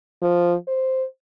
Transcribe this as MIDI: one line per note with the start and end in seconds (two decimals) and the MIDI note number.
0.23 0.55 53
0.68 1.05 72